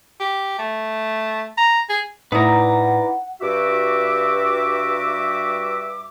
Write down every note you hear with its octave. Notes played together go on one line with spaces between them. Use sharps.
G4
A3
A#5
G#4
A2 D#4 E4 B4 D5 F#5 A#5
G2 F#4 E5 D6